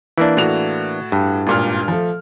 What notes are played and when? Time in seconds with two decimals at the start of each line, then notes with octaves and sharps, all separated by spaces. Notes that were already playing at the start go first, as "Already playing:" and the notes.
0.18 E3 A#3 D4
0.37 A2 F#4 F7
1.12 G2
1.47 G#1 A#2 F6
1.88 F3 A3